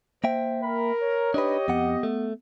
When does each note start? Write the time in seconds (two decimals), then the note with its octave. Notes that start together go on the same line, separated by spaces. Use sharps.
0.24 A#3 C5 E5 G5
0.63 A#4 B5
1.01 C#5
1.34 D4 D#4 G4 B4 D#5
1.68 F2 B3 F#5
2.03 A3